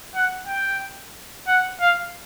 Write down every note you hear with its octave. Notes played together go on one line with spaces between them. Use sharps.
F#5
G5
F#5
F5